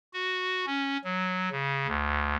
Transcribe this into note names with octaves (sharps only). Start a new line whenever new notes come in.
F#4
C#4
F#3
C#3
D2